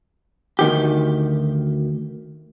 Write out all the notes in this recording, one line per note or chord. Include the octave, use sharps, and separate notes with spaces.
D2 D#3 G4